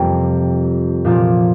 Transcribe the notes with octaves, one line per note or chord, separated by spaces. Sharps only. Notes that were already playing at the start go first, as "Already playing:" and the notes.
Already playing: F2 C3 G3 A#3
A#2 F3 A#3 F4